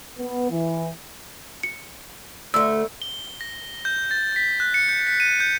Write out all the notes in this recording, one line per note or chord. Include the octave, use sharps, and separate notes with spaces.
B3
E3
C#7
D2 A3 E6
G7
A#6
G6
A6
B6
F#6
C#7
G6
B6
D#7
G6